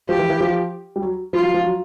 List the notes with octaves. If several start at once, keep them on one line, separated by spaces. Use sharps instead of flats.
F3 G4
E3
E3
F3
G3
F#3
F3 F4
F#3
F3
F#3